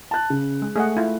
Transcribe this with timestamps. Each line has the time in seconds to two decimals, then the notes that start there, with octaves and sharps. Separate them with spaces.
0.11 A5 F#6
0.30 C#3
0.62 G#3
0.76 A3 G#4 D#5 F#5
0.97 E4 F4